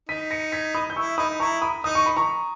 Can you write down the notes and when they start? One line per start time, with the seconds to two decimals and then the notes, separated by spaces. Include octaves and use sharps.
0.09 D#4 B6 D#7
0.31 A#6 C#7
0.52 G#6 B6
0.75 B5 D#6
0.90 G6
0.96 E4 C#6 E6
1.18 D#4 B5 D#6
1.40 E4 A#5 C#6
1.62 B5 D#6
1.84 D#4 D#6
1.95 C#6
2.06 B5
2.17 A#5 C#6